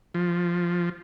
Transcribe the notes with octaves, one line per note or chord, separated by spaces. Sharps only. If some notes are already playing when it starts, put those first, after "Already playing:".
F3